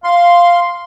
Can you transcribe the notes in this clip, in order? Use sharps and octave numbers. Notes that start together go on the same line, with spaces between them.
F5 C6